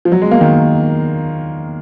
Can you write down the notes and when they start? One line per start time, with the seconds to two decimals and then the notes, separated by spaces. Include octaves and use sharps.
0.05 F3
0.12 F#3
0.22 G#3
0.31 A#3
0.41 D#3